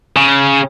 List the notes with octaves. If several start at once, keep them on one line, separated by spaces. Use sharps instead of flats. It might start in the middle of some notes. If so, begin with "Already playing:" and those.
C#3